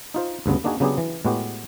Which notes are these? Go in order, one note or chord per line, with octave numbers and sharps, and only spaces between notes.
D#4 F4 C5
D2 G2 C#3 B3
A#3 D4 D#4 F#4 G#4
C#3 F#3 B3 D4 G4 G#4
E3
A2 G#3 B3 F#4 G4